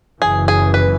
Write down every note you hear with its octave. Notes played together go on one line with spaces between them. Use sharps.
F#1 F#2 C#3 E3 G#4
G#4
B4